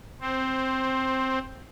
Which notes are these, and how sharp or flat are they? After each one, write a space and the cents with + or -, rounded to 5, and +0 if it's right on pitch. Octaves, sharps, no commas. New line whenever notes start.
C4 +0 C5 +15